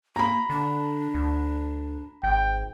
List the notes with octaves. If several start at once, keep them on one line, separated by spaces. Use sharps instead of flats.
A#3 A#5 B5
D3 D4
D2
G#1 G5